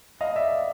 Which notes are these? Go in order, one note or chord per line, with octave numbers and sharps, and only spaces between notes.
D#5 F5
D5 E5